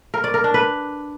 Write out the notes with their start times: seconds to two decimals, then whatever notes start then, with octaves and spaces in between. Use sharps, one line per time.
0.14 A#4
0.24 D5
0.34 A#4
0.44 D4
0.54 B4